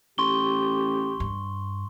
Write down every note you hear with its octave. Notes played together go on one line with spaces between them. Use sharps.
A1 G4 C6 C#6 G7
G2